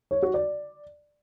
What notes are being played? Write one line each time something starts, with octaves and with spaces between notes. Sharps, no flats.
C#5
F#4
D5